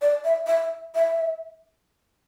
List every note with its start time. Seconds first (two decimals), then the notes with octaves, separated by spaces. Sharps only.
0.02 D5
0.25 E5
0.47 E5
0.95 E5